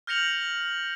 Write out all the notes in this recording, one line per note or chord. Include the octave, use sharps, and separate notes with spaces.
F6 G6 A#6 C#7 F7 F#7